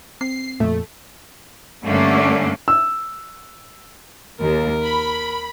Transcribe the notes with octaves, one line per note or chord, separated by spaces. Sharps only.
C4 C7
F2 A#2 A3
G2 D3 A3 A#3 C#4 D4
E6
D#2 A#4
B5